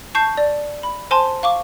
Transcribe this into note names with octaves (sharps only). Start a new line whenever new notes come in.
A5 C#6 G6 C7
D5
B5
C5 G#5 A5 C6
F5 C#6 D6